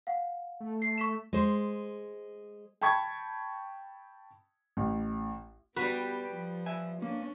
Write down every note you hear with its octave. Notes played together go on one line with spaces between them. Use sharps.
F5 F#5
A3
C7
C#6 B6 E7
G#3 C5
G5 A5 B5 C#6 G#6
A1
G3 B3 F#4 G4 B4
F3
E5 G#5
A#3 C#4 D4